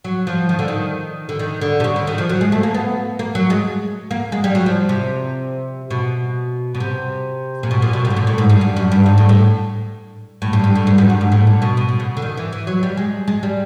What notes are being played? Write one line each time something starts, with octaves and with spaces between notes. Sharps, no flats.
F#3
F3
D#3
D3
D#3
D3
D#3
D3
C3
C#3
D3
D#3
F3
F#3
G#3
A3
A#3
B3
A#3
F#3
G#3
A#3
G#3
G3
F#3
F3
C3
B2
B2
C3
A#2
B2
A#2
B2
C3
A2
A#2
A2
G#2
G2
G2
F#2
G2
G#2
A2
A2
A2
G2
G2
A2
G#2
F#2
G2
G#2
A2
A#2
B2
B2
B2
C#3
D3
D#3
E3
E3
F#3
G3
G#3
G#3
G3